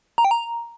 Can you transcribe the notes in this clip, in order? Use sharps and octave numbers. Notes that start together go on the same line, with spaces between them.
A#5
G5
A#5